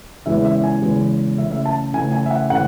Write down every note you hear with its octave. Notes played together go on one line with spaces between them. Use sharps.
E2 C#3 E3 G#3 C#4 E5
E5
G#5
E2 C#3 E3 G#3 C#4
C#3 E3 A3 E5
E5
A5
C#3 E3 A3 G#5
G#5
E5
F#5
C#3 E3 A3 F#5